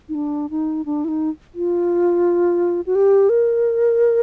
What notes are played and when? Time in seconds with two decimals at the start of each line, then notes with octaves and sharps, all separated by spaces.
0.09 D#4
0.15 D4
0.50 D#4
0.86 D4
1.04 E4
1.08 D#4
1.55 F4
2.86 F#4
2.95 G4
3.29 A#4